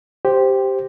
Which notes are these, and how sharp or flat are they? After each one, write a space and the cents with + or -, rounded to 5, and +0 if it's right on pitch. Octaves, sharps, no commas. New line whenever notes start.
G4 +0 C5 +0